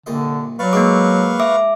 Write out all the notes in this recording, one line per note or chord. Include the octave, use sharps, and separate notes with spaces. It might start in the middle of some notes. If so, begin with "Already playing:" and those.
C2 A#2 D3 D#5
F#3 B4 D5 F5 C#6
G#3 A#3 B3 E4 D6
E5 D6